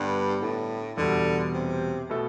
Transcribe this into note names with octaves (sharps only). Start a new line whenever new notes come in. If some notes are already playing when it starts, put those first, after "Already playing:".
Already playing: G2 D3 G3 B3 D4
A2
E2 B2 D3 G3
C3
B2 A3 E4 A4